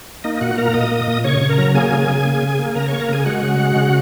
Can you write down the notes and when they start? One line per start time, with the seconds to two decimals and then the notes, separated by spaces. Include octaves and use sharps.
0.24 A#3 D#4 D#5
0.41 A#2 F#4 F#5
0.58 A#3 A#4 A#5
0.74 A#2 D#5 D#6
0.91 A#3
1.08 A#2
1.24 C#3 C#5 C#6
1.41 C#3
1.49 A#4 A#5
1.58 F#3
1.75 A#3 G#4 G#5
1.92 C#3
2.09 C#3
2.25 A#3
2.42 C#3
2.59 A#3
2.75 C#3 A#4 A#5
2.88 A#3 C#5 C#6
3.00 A#4 A#5
3.09 C#3 G#4 G#5
3.25 G#3 F#4 F#5
3.42 C#3
3.60 G#3
3.76 C#3